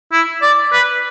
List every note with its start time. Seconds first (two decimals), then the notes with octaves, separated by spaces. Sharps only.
0.12 E4
0.42 D5
0.72 B4